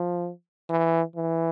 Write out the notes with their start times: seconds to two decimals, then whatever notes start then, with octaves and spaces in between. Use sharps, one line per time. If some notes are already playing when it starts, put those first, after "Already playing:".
Already playing: F3
0.70 E3
1.16 E3